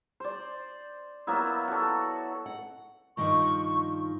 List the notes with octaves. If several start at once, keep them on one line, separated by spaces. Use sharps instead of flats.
C5 D5
F#3 A#3 B3 E4
F#4 A4
F#5
G2 D#3 F3 C#6